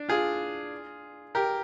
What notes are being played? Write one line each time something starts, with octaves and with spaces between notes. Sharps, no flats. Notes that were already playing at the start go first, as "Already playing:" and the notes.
Already playing: D4
F4 G#4
G4 A#4